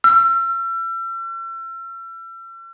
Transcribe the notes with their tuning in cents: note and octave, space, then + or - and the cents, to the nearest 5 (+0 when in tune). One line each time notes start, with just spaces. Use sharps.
E6 +40